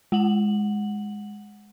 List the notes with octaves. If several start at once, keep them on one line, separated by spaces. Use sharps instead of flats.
G#3 F#5 F#7